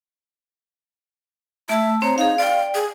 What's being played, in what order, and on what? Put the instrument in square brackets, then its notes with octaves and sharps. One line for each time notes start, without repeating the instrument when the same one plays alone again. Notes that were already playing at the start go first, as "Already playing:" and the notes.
[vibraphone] A3 A5 E6 [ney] E5
[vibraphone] C4 C5 C#5 [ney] A#5
[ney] D#4 [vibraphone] G#4 F5
[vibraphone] D5 G5 [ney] F5
[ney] G#4